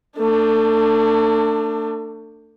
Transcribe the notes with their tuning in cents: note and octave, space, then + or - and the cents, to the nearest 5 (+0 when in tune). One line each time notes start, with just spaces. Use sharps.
A3 +35 D4 +10